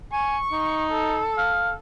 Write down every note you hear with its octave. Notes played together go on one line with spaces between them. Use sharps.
G#5 C#6
D#4
A4
F5